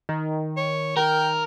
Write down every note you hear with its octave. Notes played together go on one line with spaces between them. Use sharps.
D#3
C#5
A#4 G5